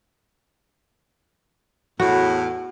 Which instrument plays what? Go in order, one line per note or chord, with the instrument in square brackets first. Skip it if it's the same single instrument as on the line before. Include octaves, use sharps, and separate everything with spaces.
[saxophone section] E2 A2 [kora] F#4